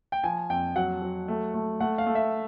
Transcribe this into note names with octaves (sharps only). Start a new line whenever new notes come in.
G5
F3 G#5
F2 G5
F#3 F#5
F#3
A3
A3
A3 F#5
F5
A3
E5